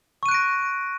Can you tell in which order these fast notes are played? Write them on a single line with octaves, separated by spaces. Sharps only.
C#6 D#7 F#6 D7 A#6